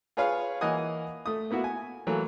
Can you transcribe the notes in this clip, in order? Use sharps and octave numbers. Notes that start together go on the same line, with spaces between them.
F4 G#4 B4 C#5 F5
E3 A#3 D#5 F#5 G#5 D#6
A3 D#6
A#3 B3 E4 F#4
G#5
E3 F#3 A3 A#3